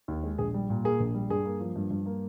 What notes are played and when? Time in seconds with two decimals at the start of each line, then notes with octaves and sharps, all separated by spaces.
0.08 D#2
0.24 G#3
0.38 A#1 G#4
0.54 G3
0.70 A#2
0.84 A#3 G#4
1.00 A#1
1.14 G3
1.30 G2 G#4
1.45 A#3
1.60 F3
1.76 G2
1.91 G2
2.06 A#3